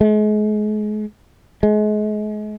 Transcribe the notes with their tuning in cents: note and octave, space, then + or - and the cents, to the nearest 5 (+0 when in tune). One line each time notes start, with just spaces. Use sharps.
G#3 +35
G#3 +35